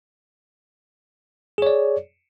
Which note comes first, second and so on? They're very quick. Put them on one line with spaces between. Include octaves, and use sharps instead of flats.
G#4 C#5 D5